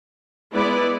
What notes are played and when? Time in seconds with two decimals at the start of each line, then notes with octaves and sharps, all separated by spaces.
0.54 G#3 B3 E4 B4 D5